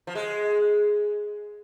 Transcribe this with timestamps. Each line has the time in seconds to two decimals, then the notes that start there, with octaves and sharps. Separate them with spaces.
0.07 F3
0.15 G#3